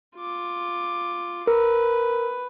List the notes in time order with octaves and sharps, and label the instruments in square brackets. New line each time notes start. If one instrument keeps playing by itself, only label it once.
[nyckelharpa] F4 D6
[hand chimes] A#4 [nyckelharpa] B4